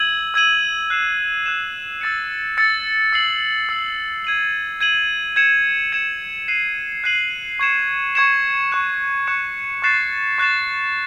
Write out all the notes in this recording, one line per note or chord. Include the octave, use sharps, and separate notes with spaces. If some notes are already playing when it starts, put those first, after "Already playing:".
Already playing: E6 G#6 D#7 F#7
E6 G#6 D#7 F#7
F#6 C7 E7
F#6 C7 E7
E6 A6 C#7
E6 A6 C#7
E6 C7 F#7
E6 C7 F#7
G#6 D#7 F#7
G#6 D#7 F#7
G#6 C#7 E7
G#6 C#7 E7
F#6 C7 D#7 F#7
F#6 C7 D#7 F#7
C#6 G#6 C#7 E7
C#6 G#6 C#7 E7
C#6 F#6 C#7 E7
C#6 F#6 C#7 E7
C#6 F#6 A6 C7 E7
C#6 F#6 A6 C7 E7